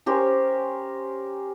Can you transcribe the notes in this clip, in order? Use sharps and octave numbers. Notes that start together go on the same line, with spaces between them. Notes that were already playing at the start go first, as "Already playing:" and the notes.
C#4 G4 A#4 C5